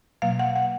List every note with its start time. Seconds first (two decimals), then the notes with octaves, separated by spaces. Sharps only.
0.22 B2 F#3 A#3 F5
0.39 F#5
0.56 F#5